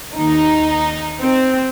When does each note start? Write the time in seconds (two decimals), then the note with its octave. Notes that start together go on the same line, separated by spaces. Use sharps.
0.15 D#2 D#3 D#4
1.21 C4